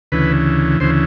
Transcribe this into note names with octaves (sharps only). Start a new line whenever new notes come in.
D2 C#3 E3 B4
D2 C#3 E3 C5